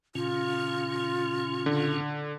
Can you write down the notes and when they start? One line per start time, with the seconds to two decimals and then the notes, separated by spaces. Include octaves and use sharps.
0.15 A#2 C#3 C#4 F4
1.66 D3